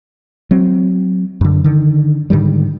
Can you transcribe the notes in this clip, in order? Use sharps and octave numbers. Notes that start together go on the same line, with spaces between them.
F#3 C4
F#2 D3
D3 D#3
G#2 D3 D#3 G3